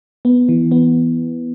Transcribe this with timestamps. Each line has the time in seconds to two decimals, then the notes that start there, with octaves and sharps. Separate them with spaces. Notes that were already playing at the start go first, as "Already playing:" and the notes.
0.25 B3
0.49 E3
0.71 B3